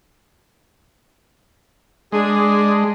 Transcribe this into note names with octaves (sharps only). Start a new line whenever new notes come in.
G#3 D4 G#4